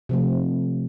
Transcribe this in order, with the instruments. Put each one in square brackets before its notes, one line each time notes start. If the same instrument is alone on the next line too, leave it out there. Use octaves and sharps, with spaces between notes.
[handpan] C3 F3 A3